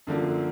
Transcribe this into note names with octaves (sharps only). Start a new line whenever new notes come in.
F#2 D3 F3 A#3